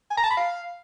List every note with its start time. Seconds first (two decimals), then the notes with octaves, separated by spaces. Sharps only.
0.10 G#5
0.17 A#5
0.24 A5
0.30 B5
0.37 F5